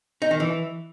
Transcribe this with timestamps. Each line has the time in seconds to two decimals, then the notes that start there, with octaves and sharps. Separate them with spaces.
0.22 D#4
0.31 D#3
0.40 E3